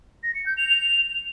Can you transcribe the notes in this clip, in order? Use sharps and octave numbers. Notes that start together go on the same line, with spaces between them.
A#6
C#7
G6
F7